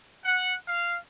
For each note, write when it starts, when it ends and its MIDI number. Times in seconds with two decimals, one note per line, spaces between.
0.25 0.55 78
0.67 0.97 77